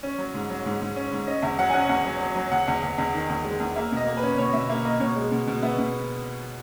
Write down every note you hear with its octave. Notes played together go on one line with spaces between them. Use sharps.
C#4
F#3
G#2
F#3
G#2
G#2
C#4
G#2
C#4 D#5
E2 E5
F#3 F#5
G#5
C#4 F#5
E2 F#5
F#3
F#3
F#3
E2 F#5
E2
E2
E2
D#3
E2
G#3
E2
A#3 E5
B2 D#5
A#3
B4
C#4
B2 C#5
B2 E5
A#3 E5
A#3 D#5
B2 C#5
G#3
B2
B2
B3 E5
B2